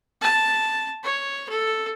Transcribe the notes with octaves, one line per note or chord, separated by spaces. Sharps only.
A5
C#5
A4